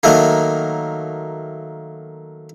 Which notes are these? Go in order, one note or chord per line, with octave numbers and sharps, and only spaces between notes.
D#3 F#3 A3 A#3